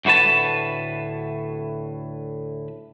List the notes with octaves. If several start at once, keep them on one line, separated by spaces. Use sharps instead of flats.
D2 A2 F#4 B4 A5